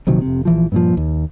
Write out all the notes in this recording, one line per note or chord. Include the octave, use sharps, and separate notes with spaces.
A#1 C3 D#3 F#3
F1 C3
A#1 E3 F3
G2 A#2 F3
D#2